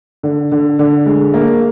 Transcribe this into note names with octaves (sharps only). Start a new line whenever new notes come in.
D3
D3
D3
G#3
A#3